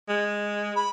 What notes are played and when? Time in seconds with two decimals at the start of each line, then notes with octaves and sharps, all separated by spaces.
0.09 G#3
0.76 B5